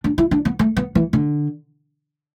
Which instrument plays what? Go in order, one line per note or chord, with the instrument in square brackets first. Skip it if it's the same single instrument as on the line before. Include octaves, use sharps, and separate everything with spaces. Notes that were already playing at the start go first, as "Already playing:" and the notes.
[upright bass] D4
E4
D4
B3
A3
B3
E3
D3